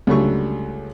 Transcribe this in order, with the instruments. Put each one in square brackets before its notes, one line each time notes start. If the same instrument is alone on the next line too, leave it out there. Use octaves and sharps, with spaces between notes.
[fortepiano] C#2 D3 F#3 G3 A3 C#6